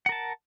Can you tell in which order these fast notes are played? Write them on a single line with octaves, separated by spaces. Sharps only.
F#5 A#4 A5